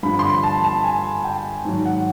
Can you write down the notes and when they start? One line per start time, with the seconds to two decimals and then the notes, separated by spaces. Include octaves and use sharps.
0.03 G2 D3 F3 B5
0.19 C6
0.23 B5
0.43 A5
0.64 A5
0.84 G#5
1.24 G5
1.65 G#2 D#3 F#3
1.85 F#5